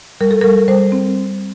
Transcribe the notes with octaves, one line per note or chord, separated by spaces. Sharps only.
G3 A#4
A4
G3 A#4
G3 C5
C4